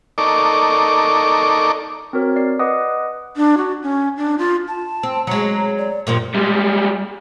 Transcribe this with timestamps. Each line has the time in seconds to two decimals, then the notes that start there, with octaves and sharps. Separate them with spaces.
0.18 D#4 A4 A#4 D5 C#6 D6
2.13 C4 F#4 A#4 C#5
2.36 D5 C7
2.59 B4 D#5 F#5 D6 D#6
3.36 D4
3.57 F#4
3.83 C#4
4.17 D4
4.38 F4
4.68 A5
5.03 C4
5.27 F#3 G#3 A#5
5.78 D5
6.07 G2 A#2 F3 A#4
6.35 G3 G#3